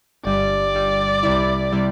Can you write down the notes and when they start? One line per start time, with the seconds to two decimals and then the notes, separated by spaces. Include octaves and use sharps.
0.25 G1 G2 G3 D5
0.74 G1 G2 G3
1.23 C2 C3 G3 E4
1.72 C3 G3 E4